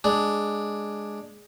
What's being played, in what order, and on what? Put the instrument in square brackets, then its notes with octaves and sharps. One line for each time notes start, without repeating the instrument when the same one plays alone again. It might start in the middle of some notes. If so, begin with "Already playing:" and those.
[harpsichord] G#3 D4